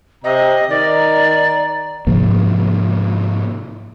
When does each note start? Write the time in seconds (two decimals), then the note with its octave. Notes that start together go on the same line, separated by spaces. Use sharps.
0.24 C3 D#5 A#5
0.70 D#3 D5
2.07 G#2 C3 F3 A#3